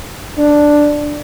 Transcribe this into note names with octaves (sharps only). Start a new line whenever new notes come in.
D4